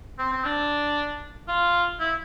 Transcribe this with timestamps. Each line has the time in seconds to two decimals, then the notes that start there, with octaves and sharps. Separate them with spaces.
0.19 C4
0.33 C4
0.45 D4
1.48 F4
2.00 E4